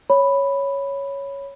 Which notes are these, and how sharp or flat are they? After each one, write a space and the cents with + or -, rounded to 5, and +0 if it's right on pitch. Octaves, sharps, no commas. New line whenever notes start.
C#5 +0 B5 +0